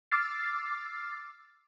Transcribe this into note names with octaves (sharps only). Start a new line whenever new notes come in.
D6 E6 F6 A6 C7